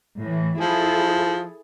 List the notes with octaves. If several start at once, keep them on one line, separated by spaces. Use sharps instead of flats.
A2 E3
F3 E4 G#4 A4